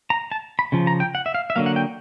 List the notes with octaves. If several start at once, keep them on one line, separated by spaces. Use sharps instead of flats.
A#5
A5
B5
C#3 F3
A#5
G5
F#5
E5
F5
E5
D3 F#3 A#3 F5
F#5
G5